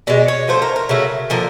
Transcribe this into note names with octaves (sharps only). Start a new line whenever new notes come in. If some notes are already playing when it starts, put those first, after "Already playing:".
B2 G#3 D5
C#5
D3 F3 A3 C5
A#4
A#4
C#3 F#3 A3
D3 F3 A#3